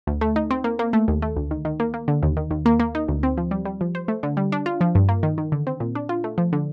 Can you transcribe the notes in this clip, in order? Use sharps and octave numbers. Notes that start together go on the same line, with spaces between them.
D2
A3
D#4
C4
A#3
A#3
A3
D#2
A3
D2
D#3
D#3
A#3
A#3
D3
D#2
D#3
D#2
A#3
A#3
D#4
D2
C4
F3
G3
G3
F3
C5
A3
D3
G3
D4
F4
F3
G2
A#3
D#3
D#3
D3
C4
A#2
D4
F4
A3
F3
D3